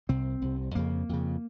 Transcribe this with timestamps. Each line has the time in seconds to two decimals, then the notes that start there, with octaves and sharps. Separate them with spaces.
0.09 C2 C3 C4
0.42 C2 C3
0.75 F2 C#3 A#3
1.09 F2 C#3